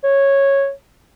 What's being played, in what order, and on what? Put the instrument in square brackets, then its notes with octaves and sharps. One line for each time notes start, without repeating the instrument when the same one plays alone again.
[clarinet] C#5